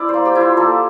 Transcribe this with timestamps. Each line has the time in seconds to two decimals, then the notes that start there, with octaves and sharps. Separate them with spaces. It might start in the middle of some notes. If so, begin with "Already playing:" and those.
Already playing: E4 D5
0.09 A#3 C5
0.25 G4
0.35 E4
0.41 F4
0.57 A#3 A4